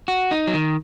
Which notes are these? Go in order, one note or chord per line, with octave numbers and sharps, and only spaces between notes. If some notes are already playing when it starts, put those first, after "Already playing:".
F#4
D#4
F#3
D#3